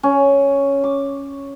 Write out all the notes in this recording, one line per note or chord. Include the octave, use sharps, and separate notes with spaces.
C#4
D6